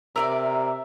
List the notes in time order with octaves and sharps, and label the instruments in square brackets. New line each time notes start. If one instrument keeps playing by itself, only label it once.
[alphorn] C3 [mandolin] A#4 B4 D5 [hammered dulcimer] E5